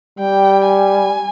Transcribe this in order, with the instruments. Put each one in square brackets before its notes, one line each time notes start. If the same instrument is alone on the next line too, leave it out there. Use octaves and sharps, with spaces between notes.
[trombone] G3 [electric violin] G5
[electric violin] G#5